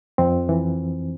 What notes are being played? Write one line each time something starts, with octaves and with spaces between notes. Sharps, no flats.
F2 C4
E3